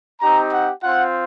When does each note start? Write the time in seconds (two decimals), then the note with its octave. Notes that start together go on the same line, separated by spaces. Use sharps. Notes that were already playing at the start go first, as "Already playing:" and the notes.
0.21 C4 D#4 G4 A#5
0.52 F#5
0.83 C4 F4 F#5